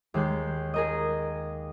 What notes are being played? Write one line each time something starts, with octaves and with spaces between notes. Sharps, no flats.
D#2 G#3 G6
G#4 A#4 D#5